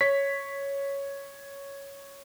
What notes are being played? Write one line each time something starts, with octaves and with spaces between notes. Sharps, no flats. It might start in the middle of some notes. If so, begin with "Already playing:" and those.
C#5 B6